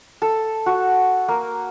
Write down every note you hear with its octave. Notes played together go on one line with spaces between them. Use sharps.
A4
F#4
A#3